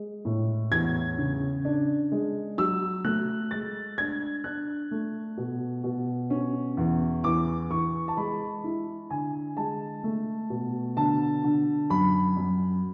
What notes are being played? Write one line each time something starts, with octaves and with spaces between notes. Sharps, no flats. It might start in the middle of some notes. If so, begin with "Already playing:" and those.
Already playing: G#3
A2
E2 G#6
C#3
D4
G#3
F#3 E6
A3 F#6
G#3 A6
D4 G#6
D4 F#6
A3
B2
B2
C#4
E2
E3 D6
E3 C#6
A5
G#3 B5
E4
D3 G#5
G#3 A5
A3
B2
D3 A5
D3
F#2 B5
F#2